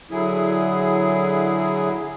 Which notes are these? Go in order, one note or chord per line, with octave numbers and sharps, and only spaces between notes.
D3 F#3 E4 G#4